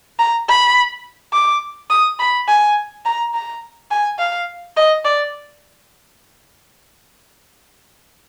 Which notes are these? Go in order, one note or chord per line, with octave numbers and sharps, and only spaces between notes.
A#5
B5
D6
D#6
B5
G#5
A#5
A#5
G#5
F5
D#5
D5